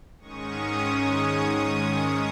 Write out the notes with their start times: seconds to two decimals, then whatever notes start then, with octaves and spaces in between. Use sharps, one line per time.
0.19 G#2 D#3 G#3 C#4 C#6 D#6
0.85 C#6 D#6